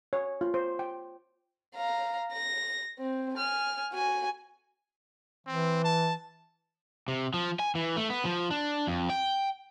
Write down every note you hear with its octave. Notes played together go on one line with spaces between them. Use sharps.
C#5
F4
C5
G5
F5 A#5
A#6
C4
G#5 F6
F#4 G#5
E3 C4
A5
C3
F3
G#5
E3
A3
B3
F3
D4
F2
G5